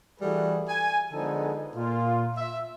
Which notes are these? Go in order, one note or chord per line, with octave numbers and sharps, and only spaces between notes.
E3 G3 A3 F#4 G#4 B4
G#5
D3 F3 G#3 B3 D#4 A4
A#2 F4
E5